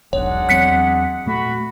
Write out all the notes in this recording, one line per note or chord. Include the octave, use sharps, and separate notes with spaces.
E1 B1 G#3 D4 C#5 F#5
E2 F#3 C4 F#6 B6 C#7
A#2 A3 F#4 B5